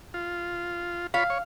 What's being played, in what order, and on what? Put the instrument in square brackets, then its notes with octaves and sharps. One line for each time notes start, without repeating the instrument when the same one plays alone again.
[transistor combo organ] F4
[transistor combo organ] F4 C#5 B5 [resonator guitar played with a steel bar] F5
[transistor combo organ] C#5